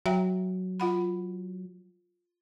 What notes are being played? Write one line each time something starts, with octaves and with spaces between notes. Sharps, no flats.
F#3 E5 G5 A#5
F4 F#5 B5